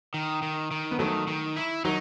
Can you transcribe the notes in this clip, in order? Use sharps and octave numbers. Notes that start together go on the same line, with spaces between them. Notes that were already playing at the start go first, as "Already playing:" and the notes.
D#3
D#3
D#3
B3
D#3 F#3 A3
D#3
E4
D#3 F#3 D#4